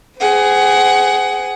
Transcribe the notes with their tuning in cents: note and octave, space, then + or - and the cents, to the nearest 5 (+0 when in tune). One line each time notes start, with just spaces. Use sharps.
G#4 +0 C5 -35 F#5 +25